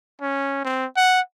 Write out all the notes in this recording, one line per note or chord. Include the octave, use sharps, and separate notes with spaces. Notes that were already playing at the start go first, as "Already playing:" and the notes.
C#4
C4
F#5